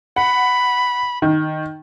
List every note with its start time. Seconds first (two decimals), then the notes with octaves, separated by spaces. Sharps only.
0.16 F#5 B5
1.22 D#3